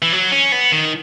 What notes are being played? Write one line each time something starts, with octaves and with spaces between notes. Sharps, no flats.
E3
F#3
C#4
B3
D#3